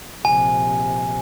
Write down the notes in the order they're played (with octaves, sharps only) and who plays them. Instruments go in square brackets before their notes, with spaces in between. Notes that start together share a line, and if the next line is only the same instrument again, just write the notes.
[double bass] A#1 C3 [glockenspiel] G#5